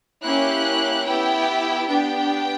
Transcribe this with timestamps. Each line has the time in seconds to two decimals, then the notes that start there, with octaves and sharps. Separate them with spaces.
0.23 A#3 C#4 E4 G4 F#6
1.04 B3 E4 G4 G5
1.86 B3 D4 G4 G5